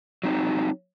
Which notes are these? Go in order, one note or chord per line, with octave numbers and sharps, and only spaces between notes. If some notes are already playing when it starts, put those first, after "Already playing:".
F#3 C4 D#4